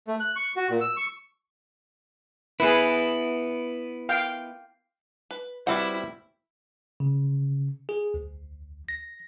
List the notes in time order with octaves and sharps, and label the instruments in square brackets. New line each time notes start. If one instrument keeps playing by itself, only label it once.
[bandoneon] A3
F#6
C#6
F#4
A#2
E6
C#6
[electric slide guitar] B3 E4 [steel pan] G#4 B4
[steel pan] F5 G5
[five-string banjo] B4
[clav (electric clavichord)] G3 C4 C5 [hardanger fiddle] E4 [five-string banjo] F#4 B4 F#5
[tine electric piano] C#3
G#4
D2
A#6